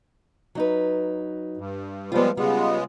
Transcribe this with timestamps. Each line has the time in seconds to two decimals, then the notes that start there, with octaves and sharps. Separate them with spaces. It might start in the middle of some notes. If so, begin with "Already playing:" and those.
0.55 F#3 D#4 B4
1.57 G2
2.12 F3 G3 G#3 B3 F4
2.37 C#3 G3 G#3 B3 F4